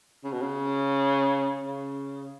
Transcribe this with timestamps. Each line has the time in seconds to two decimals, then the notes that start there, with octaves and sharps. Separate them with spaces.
0.24 C#3
0.33 B2
0.41 C#3
1.64 C#3